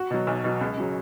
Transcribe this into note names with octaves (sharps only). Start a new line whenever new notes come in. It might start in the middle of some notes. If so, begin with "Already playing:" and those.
Already playing: F#4
B2 F#3
B1
B2 F#3
C#2
C#3 F#3